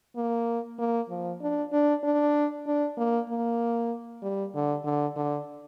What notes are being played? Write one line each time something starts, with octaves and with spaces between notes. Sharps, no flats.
A#3
A#3
F3
D4
D4
D4
D4
A#3
A#3
G3
D3
D3
D3